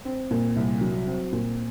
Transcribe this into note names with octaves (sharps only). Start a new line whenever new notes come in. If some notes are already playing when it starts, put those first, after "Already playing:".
C4
A#2
C2
F#3
C4
A#2